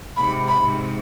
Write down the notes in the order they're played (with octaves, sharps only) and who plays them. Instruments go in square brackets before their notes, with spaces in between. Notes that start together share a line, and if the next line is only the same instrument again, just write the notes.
[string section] G#2 C3 [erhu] B5
[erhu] B5
[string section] G#2 C3